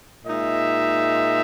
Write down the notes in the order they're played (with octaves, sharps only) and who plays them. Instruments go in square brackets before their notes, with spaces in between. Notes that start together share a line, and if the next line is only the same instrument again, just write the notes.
[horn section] A#2 G#3 D#4 E5